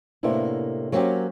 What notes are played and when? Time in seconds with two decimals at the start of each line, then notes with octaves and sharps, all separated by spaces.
0.23 A2 C3 A#3 B3 D4 E4
0.92 F#3 A#3 C4 C#4 F#4 G4